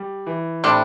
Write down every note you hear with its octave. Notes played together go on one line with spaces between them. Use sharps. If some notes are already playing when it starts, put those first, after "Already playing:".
Already playing: G3
E3
A2 C3 G3 D4